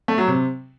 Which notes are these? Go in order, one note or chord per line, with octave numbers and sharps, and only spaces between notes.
A3
F#3
C3